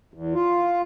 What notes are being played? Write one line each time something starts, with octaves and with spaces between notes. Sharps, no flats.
E2
F4